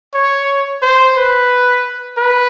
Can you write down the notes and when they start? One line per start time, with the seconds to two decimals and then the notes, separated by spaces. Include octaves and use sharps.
0.14 C#5
0.82 C5
1.17 B4
2.18 B4